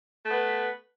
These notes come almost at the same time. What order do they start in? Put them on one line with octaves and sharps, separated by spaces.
A3 B3 B4